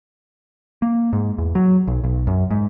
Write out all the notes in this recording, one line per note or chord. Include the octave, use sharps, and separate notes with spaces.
A#3
G#2
E2
F#3
B1
B1
F#2
G#2